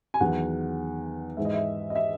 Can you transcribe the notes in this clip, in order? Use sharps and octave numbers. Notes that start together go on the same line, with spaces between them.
G#5
E2 D#3 F#3 F#5
G#2 E3 G#3 E5
D#5
E5
D#5
E5